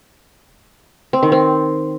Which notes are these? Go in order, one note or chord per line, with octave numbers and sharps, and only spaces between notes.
C4
D#3
C4